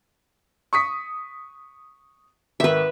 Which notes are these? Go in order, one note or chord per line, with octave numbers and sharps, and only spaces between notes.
C#6 D#6 B6
G#1 D#3 B4 E5